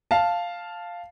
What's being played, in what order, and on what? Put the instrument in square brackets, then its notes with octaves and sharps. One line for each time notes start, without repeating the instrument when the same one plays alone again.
[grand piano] F5 A5